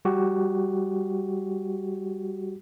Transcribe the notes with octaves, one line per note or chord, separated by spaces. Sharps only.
G3 F#4 G4